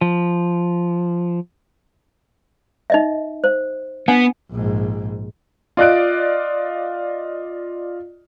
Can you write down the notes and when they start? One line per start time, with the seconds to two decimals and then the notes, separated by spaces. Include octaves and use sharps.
0.01 F3
2.90 D#4 D#5 E5
3.44 C5
4.08 B3 D4 F#5 G#5
4.51 A#1 G#2
5.77 F4 D5 D#5 F#6 D7